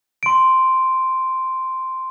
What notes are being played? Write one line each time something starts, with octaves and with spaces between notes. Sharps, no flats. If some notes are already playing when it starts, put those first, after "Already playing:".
C6 D7